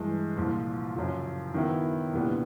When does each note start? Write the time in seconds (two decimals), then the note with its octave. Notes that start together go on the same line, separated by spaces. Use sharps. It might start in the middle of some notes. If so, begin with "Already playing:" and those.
Already playing: G2 E3 G#3
0.36 C2 A#2 F3
0.96 F#2 C#3 F3
1.54 D#3 F#3 B3 E4
2.13 C2 A#2 G3 B3 D4